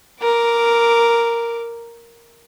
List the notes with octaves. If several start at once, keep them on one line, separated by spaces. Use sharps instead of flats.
A#4 D6